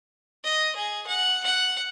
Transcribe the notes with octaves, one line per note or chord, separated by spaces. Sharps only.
D#5
G#4
F#5
F#5